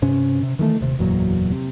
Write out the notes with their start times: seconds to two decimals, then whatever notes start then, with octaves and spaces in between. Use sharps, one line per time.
0.02 G2 C3 C#4
0.43 C3
0.59 D#3 E3 G#3 A3
0.81 D#1 C3
0.99 F#1 E2 A#2 F#3
1.52 C3